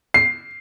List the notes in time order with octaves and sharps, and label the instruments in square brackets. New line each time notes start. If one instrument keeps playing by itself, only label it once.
[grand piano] C7